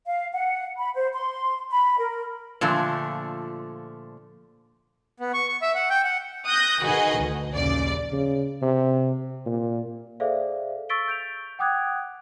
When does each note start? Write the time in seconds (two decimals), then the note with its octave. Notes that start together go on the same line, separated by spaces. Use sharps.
0.05 F5
0.33 F#5
0.78 B5
0.95 C5
1.13 C6
1.70 B5
1.98 A#4
2.61 A#2 D3 F3 A3
5.20 B3
5.34 C#6
5.48 C#6
5.62 E5
5.75 F#5
5.90 G5
6.05 F#5
6.46 D#6 F#6 G6 A#6
6.82 D#3 F#4 G#4 B4 D#5
7.19 D2
7.54 A#1 D#2 C#3 D5
8.12 C#3
8.62 C3
9.46 A#2
10.20 G#4 A4 C5 D5 E5 F5
10.89 C#6 E6 A6 B6 D7 G7
11.08 G6 D7 F7
11.59 F#5 G5 D6 D#6 F#6 G#6